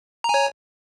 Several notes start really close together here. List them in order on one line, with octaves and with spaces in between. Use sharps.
A#5 G#5 C#5